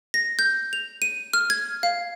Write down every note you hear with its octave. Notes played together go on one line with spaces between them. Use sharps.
A#6
G6
F7
D#7
F6
G#6
F5